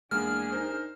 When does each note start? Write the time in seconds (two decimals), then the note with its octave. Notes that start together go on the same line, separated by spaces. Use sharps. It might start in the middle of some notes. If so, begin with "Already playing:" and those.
0.11 E2 G#3 A#3 D4 G#4 F6
0.52 D#4 A#4 C5